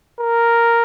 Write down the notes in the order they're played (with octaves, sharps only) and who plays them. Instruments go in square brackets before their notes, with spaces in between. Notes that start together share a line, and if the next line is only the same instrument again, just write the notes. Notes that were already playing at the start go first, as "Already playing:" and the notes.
[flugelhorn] A#4